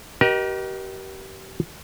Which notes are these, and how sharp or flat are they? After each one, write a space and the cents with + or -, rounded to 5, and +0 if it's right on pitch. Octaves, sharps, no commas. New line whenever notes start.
G4 -35 A#4 +35 D#5 +0